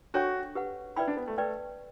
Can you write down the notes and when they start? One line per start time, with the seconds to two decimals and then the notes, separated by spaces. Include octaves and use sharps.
0.14 D4 F#4 A4 C#5 G5 C#6
0.55 G4 B4 F#5
0.96 E4 B4 D5 G5 B5
1.08 D4
1.17 B3
1.28 A3
1.38 A3 B4 D5 G5